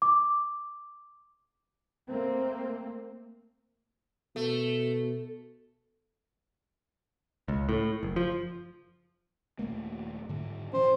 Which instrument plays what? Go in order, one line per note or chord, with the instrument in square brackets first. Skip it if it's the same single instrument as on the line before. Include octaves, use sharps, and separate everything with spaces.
[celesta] D6
[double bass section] A3 A#3 C4
[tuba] B2 [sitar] A3
[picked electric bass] C#2
A2
F#1
F3
[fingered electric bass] D#1 A3 A#3
G#2 D3
[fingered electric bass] A2 E3 C#4 [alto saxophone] C5